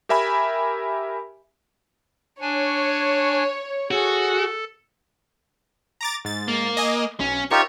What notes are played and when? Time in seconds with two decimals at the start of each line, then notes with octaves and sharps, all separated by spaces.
0.09 G4 A#4 E5 G#5 B5
2.41 D4 C#5 G#5
3.91 F#4 G#4 A4
6.01 A#5 D6 A6
6.25 G#2 A6
6.48 A#3
6.77 D#5 G#5
7.20 B1 C#4
7.51 D#4 F4 G4 A#4 C#5 E5